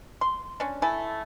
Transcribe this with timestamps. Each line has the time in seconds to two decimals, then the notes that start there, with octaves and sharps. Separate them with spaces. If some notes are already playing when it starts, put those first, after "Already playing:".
0.21 C6
0.60 C#4 D4
0.82 A3 E4 A4 G#5